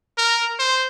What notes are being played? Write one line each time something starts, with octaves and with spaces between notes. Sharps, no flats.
A#4
C5